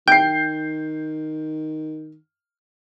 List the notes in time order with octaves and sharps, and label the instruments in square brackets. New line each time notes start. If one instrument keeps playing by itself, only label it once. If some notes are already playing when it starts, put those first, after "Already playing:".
[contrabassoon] D#3 [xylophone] G5 [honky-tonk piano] G6 C7